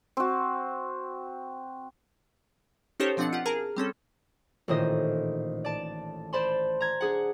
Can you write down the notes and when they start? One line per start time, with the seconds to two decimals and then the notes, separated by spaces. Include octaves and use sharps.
0.17 C4 F#4
3.00 C#4 D#4 G4 A4 C5 C#5
3.17 B2 F3 C4 D4 F#5 C#7
3.33 F4 G4 F#5
3.46 G#4 A#4 A5 A#5 F6
3.76 G3 C4 C#4 A4
4.68 A1 A#2 D#3 C5 D#5 D#6
5.65 D5 A5
6.33 C5 D5 A5 B5 C6
6.80 A#5 G#6
7.01 D4 G#4 F#5